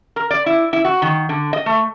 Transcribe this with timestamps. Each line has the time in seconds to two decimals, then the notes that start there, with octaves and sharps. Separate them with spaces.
0.16 A#4
0.31 D5
0.46 E4
0.73 E4
0.85 F#4
1.02 D#3
1.29 D3
1.53 D#5
1.66 A3